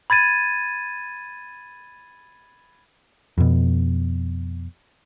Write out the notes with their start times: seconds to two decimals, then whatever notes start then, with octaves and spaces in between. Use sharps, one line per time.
0.10 B5 G#6 A6 D#7
3.38 F2 B2